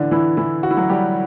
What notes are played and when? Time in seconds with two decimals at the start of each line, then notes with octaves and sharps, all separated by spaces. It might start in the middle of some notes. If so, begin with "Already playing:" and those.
Already playing: A2 D3 E3 D4
0.11 E3 E4
0.37 E3 E4
0.63 F#4
0.71 E4
0.77 F#3 F#4
0.89 G3 G4